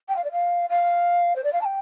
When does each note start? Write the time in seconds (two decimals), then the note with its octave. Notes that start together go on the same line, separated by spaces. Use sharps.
0.09 G5
0.16 F5
0.24 D5
0.32 F5
0.70 F5
1.36 C5
1.44 D5
1.53 F5
1.61 A5
1.65 G5